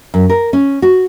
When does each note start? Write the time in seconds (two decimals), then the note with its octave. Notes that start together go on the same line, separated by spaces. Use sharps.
0.14 F#2
0.29 A#4
0.53 C#4
0.82 F#4